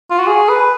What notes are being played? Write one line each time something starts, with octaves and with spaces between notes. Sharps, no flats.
F4
F#4
G#4
B4